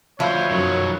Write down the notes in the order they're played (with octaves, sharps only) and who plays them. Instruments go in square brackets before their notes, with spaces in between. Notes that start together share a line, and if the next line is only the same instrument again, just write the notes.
[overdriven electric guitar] D2 C5 [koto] F3 [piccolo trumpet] C#5 [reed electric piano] E5 B5 E6
[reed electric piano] F#2 [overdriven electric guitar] D#3 F#3